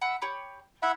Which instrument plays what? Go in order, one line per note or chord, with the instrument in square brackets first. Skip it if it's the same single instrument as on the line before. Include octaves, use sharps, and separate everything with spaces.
[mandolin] E5 F#5 B5
G4 C#5 B5
[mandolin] E4 [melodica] E5 F#5 B5